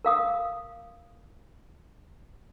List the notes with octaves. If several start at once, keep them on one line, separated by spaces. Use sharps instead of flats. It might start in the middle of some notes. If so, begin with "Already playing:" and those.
A#4 F5 D#6